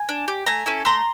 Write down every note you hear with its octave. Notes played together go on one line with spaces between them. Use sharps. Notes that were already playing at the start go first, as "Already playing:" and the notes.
Already playing: G#5
D4
G4
A3 G#5 A#5
C#4 E4 A4
A3 A#5 C6